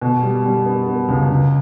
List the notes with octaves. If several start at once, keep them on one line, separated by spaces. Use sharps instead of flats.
B2
G3
G3
B3
B3
C#2
C#2